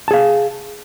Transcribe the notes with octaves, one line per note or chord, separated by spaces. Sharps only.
G#4 F5 A5